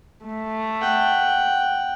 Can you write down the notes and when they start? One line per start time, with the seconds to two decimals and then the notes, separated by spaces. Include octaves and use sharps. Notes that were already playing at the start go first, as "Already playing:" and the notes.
0.24 A3
0.81 F#5 G5